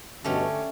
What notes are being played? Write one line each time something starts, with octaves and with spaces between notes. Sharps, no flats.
G2 B2 D3 A3 C#4 G4